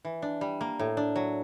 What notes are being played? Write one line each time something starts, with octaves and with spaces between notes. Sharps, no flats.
E3
D4
G3
A#3
A2
D4
F#3